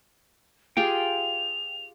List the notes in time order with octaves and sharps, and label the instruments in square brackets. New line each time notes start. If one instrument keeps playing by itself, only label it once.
[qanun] F4 G4 G#4 [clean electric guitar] G5 [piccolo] F7